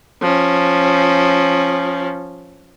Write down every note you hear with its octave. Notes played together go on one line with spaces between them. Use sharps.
F3 C#4